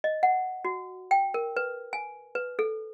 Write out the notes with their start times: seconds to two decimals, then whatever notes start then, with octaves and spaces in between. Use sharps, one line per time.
0.04 D#5
0.23 F#5
0.65 F#4
1.11 G5
1.34 A#4
1.56 B4
1.93 G#5
2.35 B4
2.59 A4